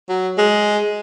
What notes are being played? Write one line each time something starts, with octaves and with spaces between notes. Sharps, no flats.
F#3
G#3